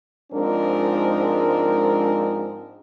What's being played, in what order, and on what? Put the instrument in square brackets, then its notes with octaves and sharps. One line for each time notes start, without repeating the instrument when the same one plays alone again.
[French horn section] G#2 F3 G#3 C4 D4 A#4